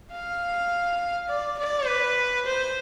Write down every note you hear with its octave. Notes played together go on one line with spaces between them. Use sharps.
F5
D5
D5
B4
C5